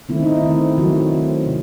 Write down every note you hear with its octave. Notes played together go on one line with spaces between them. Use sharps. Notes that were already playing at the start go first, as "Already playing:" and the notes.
D#3 A3 C4 E4
D#4
E4
D#3 A3 C4
D#3 F#3 A3 C4 F#4
D#3 A3 C4
C3